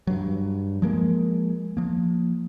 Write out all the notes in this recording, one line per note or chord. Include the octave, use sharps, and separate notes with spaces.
G2 F#3
F3 G#3 A#3
F3 A#3